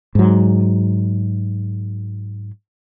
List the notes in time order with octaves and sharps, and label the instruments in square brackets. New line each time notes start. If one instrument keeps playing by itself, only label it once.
[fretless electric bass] G#2 F#3